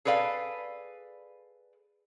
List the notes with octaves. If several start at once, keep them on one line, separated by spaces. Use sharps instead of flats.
G#4 A4 B4 D5 F5